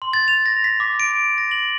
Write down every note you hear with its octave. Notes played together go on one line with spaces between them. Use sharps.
C6
A6
F7
A#6
B6
D6
D7
A#6
F#7